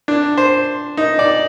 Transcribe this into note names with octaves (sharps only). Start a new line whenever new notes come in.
D4
C5
D#4
D5